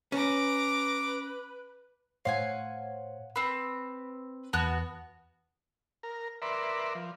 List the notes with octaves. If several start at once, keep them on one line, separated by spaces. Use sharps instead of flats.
C#4 B4 A#5 D6
A2 C5 C#5 F5 F#5 G#5
C4 B4 B5
E2 B3 F#4 A5 F#6
A#4
A#4 B4 D5 E5 C6
F3